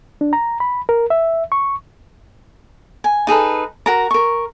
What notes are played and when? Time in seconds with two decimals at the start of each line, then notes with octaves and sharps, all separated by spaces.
0.21 D4
0.33 A#5
0.60 B5
0.89 A#4
1.10 E5
1.52 C#6
3.04 G#5
3.27 D#4 G#4 A4 B4
3.86 F#4 A#4 A#5
4.11 A#4 C#6